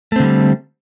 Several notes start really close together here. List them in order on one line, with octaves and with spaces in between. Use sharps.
A3 C4 D3 G3